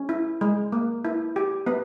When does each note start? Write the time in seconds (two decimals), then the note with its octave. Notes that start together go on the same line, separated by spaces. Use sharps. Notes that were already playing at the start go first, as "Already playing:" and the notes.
Already playing: C#4
0.09 E4
0.41 G#3
0.72 A#3
1.05 E4
1.36 G4
1.66 B3 B4